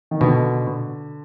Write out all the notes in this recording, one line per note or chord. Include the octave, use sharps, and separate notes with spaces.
D#3
B2 D3